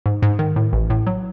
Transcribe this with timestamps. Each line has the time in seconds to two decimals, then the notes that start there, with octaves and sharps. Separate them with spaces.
0.06 G#2
0.22 G#2
0.39 D#3
0.56 A2
0.73 A1
0.90 A2
1.07 F#3